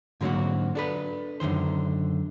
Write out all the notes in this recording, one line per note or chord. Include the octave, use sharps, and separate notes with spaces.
G#2 D3 F#3 A#3 C4 F#4
D4 A4 B4
F#2 D3 D#3 C5